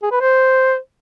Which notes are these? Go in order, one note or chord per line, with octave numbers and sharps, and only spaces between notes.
G#4
B4
C5